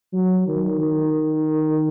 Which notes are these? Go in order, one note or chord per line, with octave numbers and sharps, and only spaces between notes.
F#3
D#3
D#3